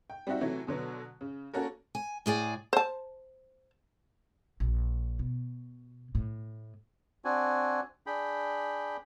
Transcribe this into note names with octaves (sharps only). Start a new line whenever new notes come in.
G5
G3 C4 D#4 F#4 E5
C3 E3 F#3 A3
B2 D3 F#3 B3
C#3
A#3 C#4 F#4 A4 A#4
G#5
A2 G#4 D5 G#5
C5 A5
A#1
B2
A2
C4 D4 F#4 G#5
D4 G#4 G5 B5